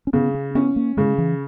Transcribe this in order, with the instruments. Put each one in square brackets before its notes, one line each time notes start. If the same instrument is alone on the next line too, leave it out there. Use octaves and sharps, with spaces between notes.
[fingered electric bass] C#4
[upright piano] C#3 [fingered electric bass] B3
[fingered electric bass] C#4
[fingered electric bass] B3 [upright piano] C#4
[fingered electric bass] A#3
[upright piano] C#3 [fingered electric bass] G#3
[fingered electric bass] E3